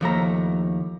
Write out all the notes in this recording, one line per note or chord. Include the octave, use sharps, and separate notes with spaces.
D#2 F3 A3 A#5